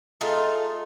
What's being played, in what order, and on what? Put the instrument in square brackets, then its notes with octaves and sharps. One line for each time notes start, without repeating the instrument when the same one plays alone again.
[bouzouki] A3 D#4 F4 G#4